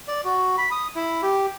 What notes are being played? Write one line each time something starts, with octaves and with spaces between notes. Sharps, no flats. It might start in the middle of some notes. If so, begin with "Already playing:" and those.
D5
F#4
B5
D#6
E4
G4